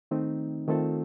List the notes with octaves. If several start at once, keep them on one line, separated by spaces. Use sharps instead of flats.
D#3 A3 C4 D#4
D#3 A3 C4 F4 A4